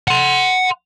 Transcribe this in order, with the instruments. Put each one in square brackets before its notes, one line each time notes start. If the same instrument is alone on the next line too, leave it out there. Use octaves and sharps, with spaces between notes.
[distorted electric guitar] F#5 C6